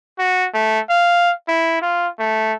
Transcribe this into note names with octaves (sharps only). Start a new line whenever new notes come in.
F#4
A3
F5
E4
F4
A3